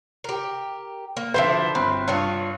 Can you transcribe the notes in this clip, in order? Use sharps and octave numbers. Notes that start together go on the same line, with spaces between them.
G4 A#4
A#3
D3 F3 E4 C5 E5
G1 C4 B5 C6
G2 B3 F4 C#5